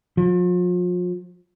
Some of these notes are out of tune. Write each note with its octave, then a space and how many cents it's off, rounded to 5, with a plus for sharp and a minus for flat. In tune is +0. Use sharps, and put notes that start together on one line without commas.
F3 +40